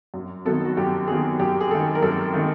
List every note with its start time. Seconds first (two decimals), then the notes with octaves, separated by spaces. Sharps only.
0.14 F#2
0.45 D#3 F#3 B3 A4
0.65 F#4
0.77 F#2 G4
1.08 D#3 F#3 B3 G#4
1.40 F#2 G4
1.61 G#4
1.71 D#3 G#3 A4
1.95 A#4
2.02 F#2 A4
2.34 D#3 G#3